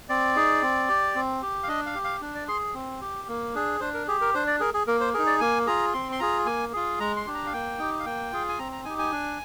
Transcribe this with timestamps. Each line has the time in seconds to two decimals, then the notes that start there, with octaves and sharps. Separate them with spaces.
0.09 C4 D5
0.36 D#4 G#4
0.62 C4
0.89 G4
1.15 C4
1.42 G4
1.63 F5
1.68 D4 D#5
1.86 F5
1.95 G4
2.04 F5
2.21 D4
2.35 D5
2.48 G#4 C6
2.74 C4
3.01 G4
3.28 A#3
3.54 D4 G#4
3.80 D4 C5
3.94 A#4
4.07 G4 G#4
4.21 A#4
4.34 D4 C5
4.47 D5
4.60 G#4 A#4
4.74 G#4
4.87 A#3 A#4
5.00 C5
5.14 G#4 A#4
5.18 D#4
5.27 D5
5.40 A#3 G#5
5.66 F4 G#4 A#5
5.93 C4 C6
6.12 C6
6.19 F4 G#4 A#5
6.46 A#3 G#5
6.73 F4 G#4
7.00 G#3 A#5
7.17 C6
7.26 D4 G4
7.34 A#5
7.46 F5
7.53 A#3 G5
7.79 D#4 G4
8.00 F5
8.05 A#3 G5
8.32 F4 G#4
8.49 G#5
8.59 C4 A#5
8.72 A#5
8.85 D#4 G4 G#5
8.99 G#5
9.12 D4